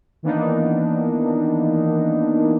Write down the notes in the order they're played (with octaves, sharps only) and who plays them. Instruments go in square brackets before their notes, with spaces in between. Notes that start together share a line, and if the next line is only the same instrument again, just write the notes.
[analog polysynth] D#3 E3 A#3 B3 D4 D#4